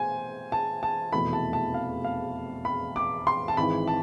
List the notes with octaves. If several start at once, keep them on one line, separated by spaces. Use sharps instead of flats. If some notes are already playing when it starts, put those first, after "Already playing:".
Already playing: B2 A3 C5 G#5
A5
A5
F1 E2 B2 A3 E4 B5
A5
A5
F5
F5
B5
D6
C6
A5
G#1 G#2 E3 B5
A5